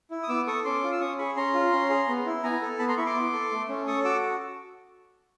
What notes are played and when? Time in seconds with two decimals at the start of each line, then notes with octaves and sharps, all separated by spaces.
0.11 E4
0.23 D#6
0.29 B3 D6 E6
0.47 A4 C#6 D#6
0.64 C#4 C6 D6
0.83 F4
0.92 E6
1.00 C#4 C#6 D#6
1.18 G#4 B5 C#6
1.37 C#4 A#5 C6
1.54 F4
1.73 C#4
1.90 G#4
2.08 B3
2.26 E4
2.43 B3 G#5 A#5
2.62 A4
2.79 B3 A5 B5
2.88 A#5 C6
2.97 E4 B5 C#6
3.06 C6 D6
3.15 B3
3.33 A4
3.51 A3
3.69 C#4
3.87 A4 C#6 D#6
4.04 F#4 D6 E6